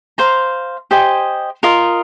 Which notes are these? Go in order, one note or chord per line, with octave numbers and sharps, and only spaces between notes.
C5 F5 A#5
G4 C5 D#5 G#5
F4 A#4 D#5